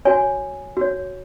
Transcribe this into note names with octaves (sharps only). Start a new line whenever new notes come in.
F#4 C#5 G#5
F#4 C#5